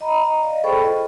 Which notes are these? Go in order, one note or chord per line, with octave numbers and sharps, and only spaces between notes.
D#5 A#5 B5
D#5 A#5
D5 D#5 F5
G#4 A4 C5 G5 B5 C#6
F4 D#5